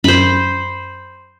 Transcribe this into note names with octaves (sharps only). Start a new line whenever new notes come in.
F#2 C5 B5